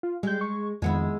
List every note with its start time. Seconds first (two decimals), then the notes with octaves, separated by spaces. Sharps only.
0.03 F4
0.23 G3 G#3 G6
0.41 C#6
0.82 F2 D#3 G#3 B3 E4